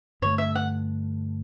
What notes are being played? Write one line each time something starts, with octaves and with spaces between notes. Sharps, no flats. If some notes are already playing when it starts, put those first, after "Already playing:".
G2 D3 A3 C#5
E5
F#5